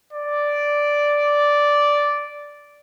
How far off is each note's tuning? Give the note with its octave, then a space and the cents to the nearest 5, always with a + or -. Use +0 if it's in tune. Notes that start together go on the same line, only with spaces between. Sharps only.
D5 -5